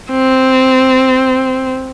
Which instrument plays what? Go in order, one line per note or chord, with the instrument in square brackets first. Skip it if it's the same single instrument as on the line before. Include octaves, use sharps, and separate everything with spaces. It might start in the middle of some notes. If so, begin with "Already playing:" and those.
[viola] C4